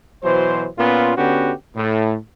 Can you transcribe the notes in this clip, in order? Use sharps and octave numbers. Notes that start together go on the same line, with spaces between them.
B2 E3 F#3 C5
A#2 B3 C#4 F4
D3 B3 C#4 F#4 G4
A2